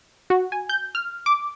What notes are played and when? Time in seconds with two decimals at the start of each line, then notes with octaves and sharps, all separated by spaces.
0.30 F#4
0.52 G#5
0.69 G6
0.95 F6
1.26 D6